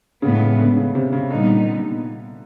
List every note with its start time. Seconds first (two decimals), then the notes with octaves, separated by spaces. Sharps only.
0.22 A2 C#3 E3 G#3 B3
0.59 D3
0.76 C#3
0.95 C3
1.13 C#3
1.30 A#2 D3 G3 B3 D#4